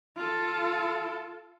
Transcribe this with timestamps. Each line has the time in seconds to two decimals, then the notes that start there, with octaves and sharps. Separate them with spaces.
0.17 F4 A4